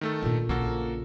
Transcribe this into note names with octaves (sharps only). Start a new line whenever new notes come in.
D#3 A3 A4
A#2 D3
A#1 C#3 A#3 F#4 A4